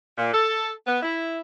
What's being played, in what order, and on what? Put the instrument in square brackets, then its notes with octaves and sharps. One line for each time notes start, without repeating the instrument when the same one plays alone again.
[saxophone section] A#2
A4
B3
E4